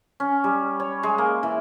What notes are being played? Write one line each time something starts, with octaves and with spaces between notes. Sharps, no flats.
C#4
G3
C#5
G#3
A#3
E3